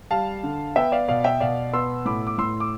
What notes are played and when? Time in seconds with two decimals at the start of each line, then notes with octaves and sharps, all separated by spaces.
0.11 G3 F5 A5
0.43 D3
0.76 B3 E5 G5
0.92 D5 F5
1.08 B2 D5 F5
1.24 E5 G5
1.40 B2 D5 F5
1.73 B3 C6 E6
2.05 A2 B5 D6
2.27 D6
2.38 A2 C6 E6
2.60 D6